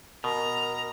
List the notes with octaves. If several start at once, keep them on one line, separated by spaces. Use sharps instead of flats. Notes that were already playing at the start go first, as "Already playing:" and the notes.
B2 A#4 A#5